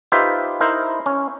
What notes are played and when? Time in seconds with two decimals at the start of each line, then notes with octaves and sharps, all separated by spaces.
0.12 D#4 F4 G4 B4 C5 E5
0.61 D#4 E4 A#4 C5
1.06 C#4